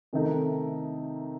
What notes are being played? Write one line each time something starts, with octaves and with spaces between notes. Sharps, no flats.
C3 D#3 A3 D#4